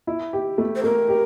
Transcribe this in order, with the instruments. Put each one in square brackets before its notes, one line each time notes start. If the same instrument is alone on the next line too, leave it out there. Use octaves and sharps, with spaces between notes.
[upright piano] E4
G4
A3
[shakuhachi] C5
[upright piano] A3 [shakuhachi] A#4
[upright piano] G4